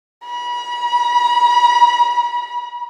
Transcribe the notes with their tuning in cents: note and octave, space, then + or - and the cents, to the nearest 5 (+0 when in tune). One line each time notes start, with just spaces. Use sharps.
B5 -35